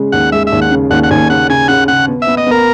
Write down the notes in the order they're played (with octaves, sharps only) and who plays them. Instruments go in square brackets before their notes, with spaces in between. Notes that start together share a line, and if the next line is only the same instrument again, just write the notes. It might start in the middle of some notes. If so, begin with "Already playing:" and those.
Already playing: [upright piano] C#3 G#3
[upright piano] D#2 [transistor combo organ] F#5
[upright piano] G#3 [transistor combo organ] E5
[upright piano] D#2 [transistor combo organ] E5
[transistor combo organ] F#5
[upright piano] C#3
[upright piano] D#2 [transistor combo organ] F#5
[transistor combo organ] F#5
[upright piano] D#2 [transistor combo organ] G#5
[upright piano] C#3 [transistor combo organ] F#5
[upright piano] C#3 [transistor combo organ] G#5
[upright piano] C#3 [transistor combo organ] F#5
[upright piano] C#3 [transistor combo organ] F#5
[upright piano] B3
[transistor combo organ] E5
[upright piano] B3
[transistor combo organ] D#5
[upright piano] B3 [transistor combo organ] A#4